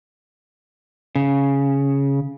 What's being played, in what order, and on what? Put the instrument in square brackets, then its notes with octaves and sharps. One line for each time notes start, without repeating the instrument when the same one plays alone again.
[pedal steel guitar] C#3